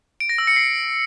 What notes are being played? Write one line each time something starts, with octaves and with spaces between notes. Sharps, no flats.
D7
A#6
E6
C#7
C7